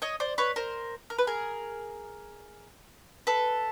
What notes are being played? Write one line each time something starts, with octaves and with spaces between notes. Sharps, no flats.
C#5 D#5
C5 D5
B4 C#5
A#4 C5
A#4
B4
G#4 A#4
A4 B4